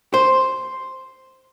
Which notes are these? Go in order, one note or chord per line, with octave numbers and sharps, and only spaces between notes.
C5